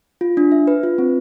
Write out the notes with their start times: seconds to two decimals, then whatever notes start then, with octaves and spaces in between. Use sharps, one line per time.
0.21 F4
0.37 D4
0.52 E5
0.67 B4
0.83 F4
0.98 C4